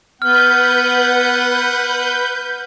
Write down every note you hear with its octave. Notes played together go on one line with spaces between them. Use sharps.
B3 B4 F#5 F6 G6